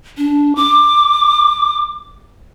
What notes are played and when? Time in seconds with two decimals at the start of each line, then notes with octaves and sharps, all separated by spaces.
0.18 D4
0.56 D6